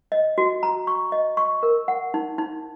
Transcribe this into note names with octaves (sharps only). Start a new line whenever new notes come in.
D#5
F#4
A#5
C#6
D#5
C#6
A#4
F#5
D#4
D#4